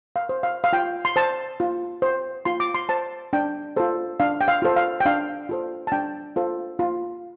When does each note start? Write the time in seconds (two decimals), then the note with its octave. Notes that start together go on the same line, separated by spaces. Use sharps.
0.16 F5
0.29 C5
0.43 F5
0.64 F5
0.73 F4 G5
1.05 C6
1.16 C5 A5
1.60 F4
2.02 C5
2.45 F4 C6
2.60 D6
2.75 C6
2.89 C5 A5
3.33 D4 G5
3.76 F4 A4 C5
4.20 D4 F5
4.41 G5
4.48 F5
4.62 F4 A4 C5
4.76 F5
5.00 G5
5.05 D4 F5
5.49 F4 A4 C5
5.87 A5
5.92 D4 G5
6.36 F4 A4 C5
6.79 F4